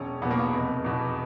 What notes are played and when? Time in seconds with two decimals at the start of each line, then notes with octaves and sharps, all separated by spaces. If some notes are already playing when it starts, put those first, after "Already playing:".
Already playing: E1 C#4
0.22 E2 B2 B3
0.30 A#3
0.40 B3
0.53 F1
0.85 E2 B2